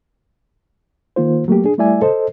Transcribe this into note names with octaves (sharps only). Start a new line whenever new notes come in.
D#3 A#3 F4 C5
F#3 A3 A#3 G4
D4 G#4
G3 A3 E4 D5 E5 G#5
A4 C5 D#5